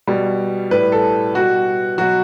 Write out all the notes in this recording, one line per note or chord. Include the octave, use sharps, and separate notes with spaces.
B2 G3
A2 G3 B4
A4
B2 G3 F#4
B2 F#3 F#4